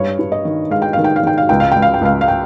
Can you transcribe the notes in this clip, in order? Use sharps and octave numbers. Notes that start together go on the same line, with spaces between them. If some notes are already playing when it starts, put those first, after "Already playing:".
Already playing: G2 C#5
G2
D#5
D#3
G#3 F5
G5
D#3 F5
G5
F5
D#3 G5
F5
C#2 G5
F5
C#2 G5
F5
G5
C#2 F5
F5
G5